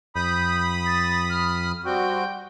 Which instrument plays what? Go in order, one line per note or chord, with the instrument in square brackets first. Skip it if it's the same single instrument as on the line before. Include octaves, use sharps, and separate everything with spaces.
[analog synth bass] F2 [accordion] B5 D#6 [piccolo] G6
[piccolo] A6
F6
[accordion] G3 C4 F#4 [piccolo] G5